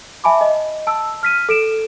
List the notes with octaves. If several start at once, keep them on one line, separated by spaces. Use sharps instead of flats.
E5 G#5 A5 B5 D6
D#5
A5 E6
F6 B6 D#7
A4 D7 E7